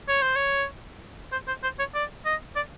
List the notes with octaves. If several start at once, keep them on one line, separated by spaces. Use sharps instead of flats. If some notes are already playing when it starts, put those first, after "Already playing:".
C#5
C5
C#5
C5
C5
C5
C#5
D5
D#5
D5